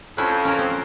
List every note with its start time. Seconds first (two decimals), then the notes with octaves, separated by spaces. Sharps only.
0.18 F2 C#4 E4
0.45 C#4 A#4
0.59 C4